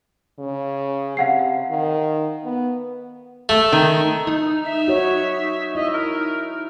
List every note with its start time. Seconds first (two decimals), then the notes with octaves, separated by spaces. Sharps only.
0.39 C#3
1.17 C3 F5 F#5 C7
1.70 D#3
2.45 B3
3.49 A3
3.72 D#3
4.27 D#4
4.65 E5
4.88 F#4 C#5
5.75 E4 D#5 E5
5.93 A#4